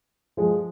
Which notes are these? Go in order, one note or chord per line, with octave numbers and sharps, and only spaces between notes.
F3 G#3